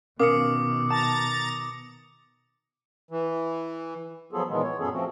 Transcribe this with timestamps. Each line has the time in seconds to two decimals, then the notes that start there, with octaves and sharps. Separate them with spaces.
0.20 B2 D#3 C#4 A#4 F5 D6 D#6 C#7
0.90 A5 A#5 A6
3.11 E3
4.33 F3 F#3 B3 F4 G#4 A4
4.49 A#2 D#3 E3 G#3 B3 F4
4.62 C#5
4.79 F#2 A#2 B3 C#4 G#4 A4
4.93 F3 A3 C4 F#4